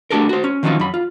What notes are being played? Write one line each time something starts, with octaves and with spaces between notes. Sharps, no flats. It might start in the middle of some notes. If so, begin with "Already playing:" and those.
A3 D4 F#4 G4 A4 A#4
F#4 C5
C#4
D#3 F3 F#3 C#4 D#4 F4
F#2 B5
F4